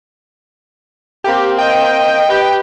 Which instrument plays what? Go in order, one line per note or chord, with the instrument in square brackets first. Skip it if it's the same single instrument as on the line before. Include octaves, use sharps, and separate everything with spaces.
[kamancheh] A#3 C4 [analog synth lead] G4
[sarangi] D#5 [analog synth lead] G5
[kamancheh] G4 B4